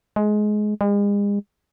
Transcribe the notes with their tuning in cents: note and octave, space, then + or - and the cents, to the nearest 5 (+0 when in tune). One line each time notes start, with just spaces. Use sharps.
G#3 +20
G#3 -40